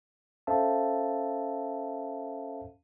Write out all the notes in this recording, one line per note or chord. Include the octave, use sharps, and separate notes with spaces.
C#4 A4 C5 E5 F5 A5